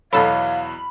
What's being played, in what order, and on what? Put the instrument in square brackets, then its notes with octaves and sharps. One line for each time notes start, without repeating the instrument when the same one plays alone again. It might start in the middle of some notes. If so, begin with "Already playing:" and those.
[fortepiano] E2 B2 F#3 [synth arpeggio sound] A4 [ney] F5 [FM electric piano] B5